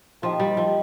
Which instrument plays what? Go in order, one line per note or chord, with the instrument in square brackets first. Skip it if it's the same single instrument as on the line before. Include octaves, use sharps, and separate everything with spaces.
[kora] F3 [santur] A#3 D#4 G4
[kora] G3
F3